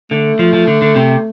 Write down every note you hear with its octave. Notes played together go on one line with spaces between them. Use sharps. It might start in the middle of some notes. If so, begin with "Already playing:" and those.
D3 A3
F3
F3
D3
D3
C3